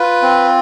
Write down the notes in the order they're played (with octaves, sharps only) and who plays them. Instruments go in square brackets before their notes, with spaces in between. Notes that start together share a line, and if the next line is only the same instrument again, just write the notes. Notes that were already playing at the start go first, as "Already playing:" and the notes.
Already playing: [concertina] F4 B4
C4